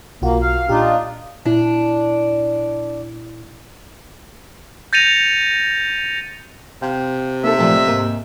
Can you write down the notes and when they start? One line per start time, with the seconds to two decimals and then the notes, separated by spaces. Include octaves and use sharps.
0.22 B1 A#3 F4 F#4
0.42 F5
0.69 A#2 D4 D#4 F4 G4
1.45 A#2 D4 E4
4.93 G6 A6 A#6 C#7 D#7 F7
6.82 C3 F5 G5
7.44 A#3 D#4 A4 E5
7.59 A#2 F3 A3 D5
7.76 D#5
7.88 G#2 A#3